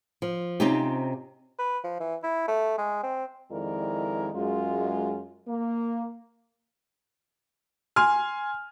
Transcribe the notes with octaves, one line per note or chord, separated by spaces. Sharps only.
F3
C3 C4 C#4 D#4 F4 G4
B4
F3
E3
E4
A3
G#3
C4
F2 D#3 G#3 E4 A#4 D5
F#2 G#3 F4
A#3
G#5 C6 F6